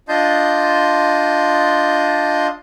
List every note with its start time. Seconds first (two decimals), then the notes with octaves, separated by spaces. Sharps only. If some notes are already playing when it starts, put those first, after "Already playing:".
0.09 D4 F4 D#5 A5 C6 G6